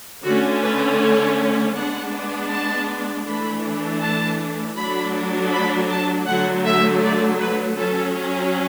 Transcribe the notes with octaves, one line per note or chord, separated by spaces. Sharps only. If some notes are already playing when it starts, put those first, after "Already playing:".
D3 A3 C#4 F#4
B4
C#5
G#3 B3 D4 F#5
A5
E3 A3 D4 B5
A5
F#3 A3 D4 B5
B5
A5
D3 F#3 A3 F#5
E5
D5
B4
F#3 C#4 A4